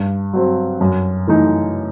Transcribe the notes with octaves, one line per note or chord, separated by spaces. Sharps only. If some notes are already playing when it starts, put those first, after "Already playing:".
Already playing: G2
F#3 C4
F#2
E3 A3 D#4